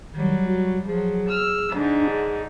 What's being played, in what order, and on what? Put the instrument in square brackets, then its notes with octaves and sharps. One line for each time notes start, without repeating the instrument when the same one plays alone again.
[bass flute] D#3 [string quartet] F#3 G3
[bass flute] F#4
[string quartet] F3 F#3 [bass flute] G#4
[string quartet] E6 F6
[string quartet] G#2 D3 D#4 [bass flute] D4
[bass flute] G#4